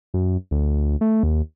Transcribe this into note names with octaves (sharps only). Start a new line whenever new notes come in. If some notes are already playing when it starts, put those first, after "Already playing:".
F#2
D2
A3
D#2